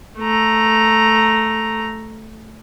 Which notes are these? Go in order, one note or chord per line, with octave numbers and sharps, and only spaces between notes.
A3 A#5